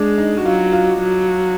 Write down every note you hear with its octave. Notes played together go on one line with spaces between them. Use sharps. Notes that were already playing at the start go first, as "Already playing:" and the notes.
Already playing: G#3 D4
D#4
F#4
F#3 F4
F4
F#3